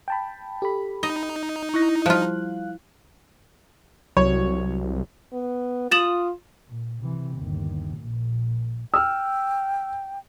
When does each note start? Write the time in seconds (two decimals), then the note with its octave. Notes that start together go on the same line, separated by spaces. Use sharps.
0.08 G5 A5 B5
0.62 G4 A4 B5
1.03 D#4 D#5
1.74 E4 C#6 F#6 A#6
2.06 F3 G3 F4 F5 F#6
4.17 C2 F#3 C#5
5.33 B3
5.91 F4 D#6 A6 E7 F#7
6.68 A#2
7.01 C3 E3
7.37 G1 D#2
7.97 A#1 A#2
8.94 G5 E6 F6